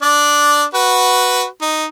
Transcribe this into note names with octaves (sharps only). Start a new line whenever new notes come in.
D4 D5
F#4 B4
D#4